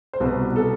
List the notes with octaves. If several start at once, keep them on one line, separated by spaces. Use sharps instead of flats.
C5
C2 B2 B4
A4